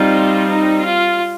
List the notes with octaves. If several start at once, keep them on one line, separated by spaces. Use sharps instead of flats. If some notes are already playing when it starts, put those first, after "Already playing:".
Already playing: G3 C4 D#4 F4
D#4
F4